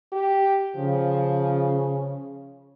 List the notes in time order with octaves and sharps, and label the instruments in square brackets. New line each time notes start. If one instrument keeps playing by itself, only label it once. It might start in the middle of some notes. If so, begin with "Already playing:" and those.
[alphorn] G4
[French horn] C#3 [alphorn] F3